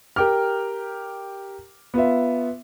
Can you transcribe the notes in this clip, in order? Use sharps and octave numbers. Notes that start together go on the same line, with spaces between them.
G4 A#4 G5 D6 F6
B3 F4 E5